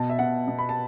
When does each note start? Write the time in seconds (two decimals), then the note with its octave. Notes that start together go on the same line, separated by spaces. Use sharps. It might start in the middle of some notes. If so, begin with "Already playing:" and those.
Already playing: B2 A5
0.10 E5
0.19 B2 F#5
0.48 B2
0.58 B5
0.69 A5